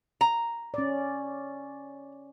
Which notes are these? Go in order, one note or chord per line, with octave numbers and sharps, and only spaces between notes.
A#5
C#4 D5